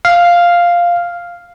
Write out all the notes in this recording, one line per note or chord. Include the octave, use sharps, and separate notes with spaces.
F5